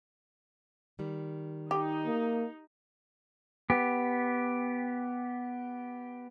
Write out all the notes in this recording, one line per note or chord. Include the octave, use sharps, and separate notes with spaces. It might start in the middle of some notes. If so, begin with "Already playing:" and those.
D#3 G3
D#4 G4
A#3
B3 G4